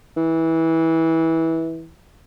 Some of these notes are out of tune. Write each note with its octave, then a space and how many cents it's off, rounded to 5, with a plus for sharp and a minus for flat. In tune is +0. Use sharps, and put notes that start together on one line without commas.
E3 -20